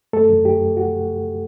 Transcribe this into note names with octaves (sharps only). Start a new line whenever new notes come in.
F#2 A3 A4
F#2
F#2 G4
F#2
F#4